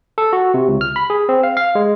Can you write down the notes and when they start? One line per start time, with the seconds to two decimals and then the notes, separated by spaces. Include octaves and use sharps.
0.18 A4
0.33 F#4
0.54 C3
0.68 C#2
0.81 F6
0.96 B5
1.10 G#4
1.29 C4
1.43 F5
1.57 F5
1.75 G#3